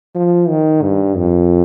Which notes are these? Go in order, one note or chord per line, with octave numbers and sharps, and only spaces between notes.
F3
D#3
G2
F2